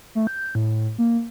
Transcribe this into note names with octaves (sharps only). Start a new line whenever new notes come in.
A3
G6
A2
A#3